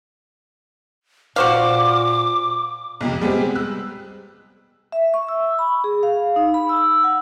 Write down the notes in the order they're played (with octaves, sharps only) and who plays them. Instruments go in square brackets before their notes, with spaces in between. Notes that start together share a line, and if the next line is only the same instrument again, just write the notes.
[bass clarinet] A#2 [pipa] F#4 C5 F5 [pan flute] D6
[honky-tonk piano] B1 F2 C3
G3 G#3 B3 C4 G4
E6 F#6
[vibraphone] E5
C#6
E6
B5
G#4
F5
D#4
B5
E6
F#5